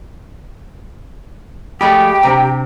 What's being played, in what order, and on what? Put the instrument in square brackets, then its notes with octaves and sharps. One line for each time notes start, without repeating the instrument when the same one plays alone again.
[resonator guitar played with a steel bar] F3 G#3 A3 [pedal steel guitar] G4 [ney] G5 [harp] B5
[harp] C3 D4 [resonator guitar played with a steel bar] A#5